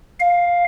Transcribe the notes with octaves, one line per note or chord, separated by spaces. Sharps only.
F5